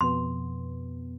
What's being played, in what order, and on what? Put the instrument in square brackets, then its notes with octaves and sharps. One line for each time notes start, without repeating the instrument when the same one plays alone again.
[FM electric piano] F2 B2 B3 [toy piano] C6